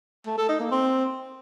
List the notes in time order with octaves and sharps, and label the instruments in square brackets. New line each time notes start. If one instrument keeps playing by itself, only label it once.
[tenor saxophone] A3
A4
D#4
A#3
C4